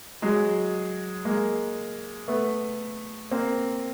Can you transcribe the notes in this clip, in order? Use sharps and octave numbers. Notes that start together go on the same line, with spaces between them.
F#3 G#3
G#3 A#3
A3 B3
A#3 C4